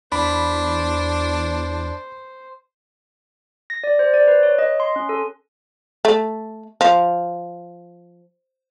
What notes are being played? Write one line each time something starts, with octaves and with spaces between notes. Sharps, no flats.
E2 D4 C5 B5
A#6
D5
C5
D5
B4
C#5
D#5
C6
C#4
A4
A3
F3